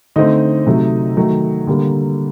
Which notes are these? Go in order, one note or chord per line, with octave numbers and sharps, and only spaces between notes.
D3 A3 C4 D#4 D#5
C3 F#3 A3
D#3 F#3 A3
D3 G3 A#3